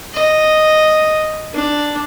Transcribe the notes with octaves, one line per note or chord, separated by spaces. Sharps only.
D#5
D4